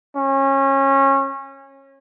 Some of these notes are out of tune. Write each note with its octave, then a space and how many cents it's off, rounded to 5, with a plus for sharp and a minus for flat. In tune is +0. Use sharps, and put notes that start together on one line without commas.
C#4 -25